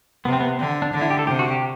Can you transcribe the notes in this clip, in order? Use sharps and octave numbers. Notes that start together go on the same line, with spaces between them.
C3 B3
C4
B3
D3 C4
D4
D3 D4
E4
G4
A4
C3 G4
F#4
G4